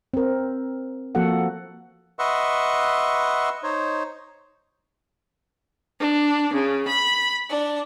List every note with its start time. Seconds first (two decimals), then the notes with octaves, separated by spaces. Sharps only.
0.14 C4 A#4
1.15 F3 A#3 F#4 A4 F#5
2.19 B4 D#5 E5 F#5 C6 C#6
3.63 D#4 C5 C#5
5.99 D4
6.52 C#3
6.87 B5
7.49 D4